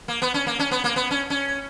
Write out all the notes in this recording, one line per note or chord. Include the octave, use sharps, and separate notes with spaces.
A#3
B3
C#4
A#3
C#4
B3
A#3
B3
C#4
C#4